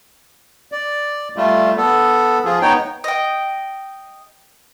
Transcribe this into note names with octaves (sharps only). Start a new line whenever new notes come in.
D5
G3 A3 F4
B3 A4
F3 F4 G#4
B3 D#4 C#5 G5
D#5 G5